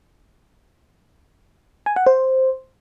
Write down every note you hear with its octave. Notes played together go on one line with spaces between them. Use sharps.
G#5
F#5
C5